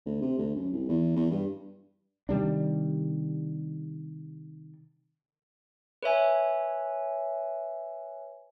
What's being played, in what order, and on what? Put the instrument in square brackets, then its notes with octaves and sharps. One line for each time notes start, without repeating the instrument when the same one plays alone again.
[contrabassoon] D2
C3
D2
F#2
C2
E2
E2
G2
[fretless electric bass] C3 D#3 G3 D4
[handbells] B4 C#5 E5 G#5